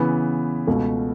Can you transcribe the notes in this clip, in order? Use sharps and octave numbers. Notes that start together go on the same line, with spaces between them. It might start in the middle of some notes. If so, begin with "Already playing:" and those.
Already playing: C#3 E3 B3
C#2 B2 A3